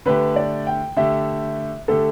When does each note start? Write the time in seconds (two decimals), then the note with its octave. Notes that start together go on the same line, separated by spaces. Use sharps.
0.06 D3 A3 G4 B4
0.36 D5
0.67 G5
0.96 D3 A3 G4 E5
1.88 D3 A3 G4 A4